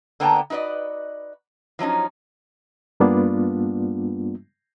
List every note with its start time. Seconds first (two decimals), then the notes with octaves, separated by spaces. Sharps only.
0.20 D3 A#3 B3 G5 A5 A#5
0.50 D#4 F#4 B4 D5 D#5
1.79 F3 F#3 C#4 D#4
3.00 G2 G3 A#3 B3 D4 F4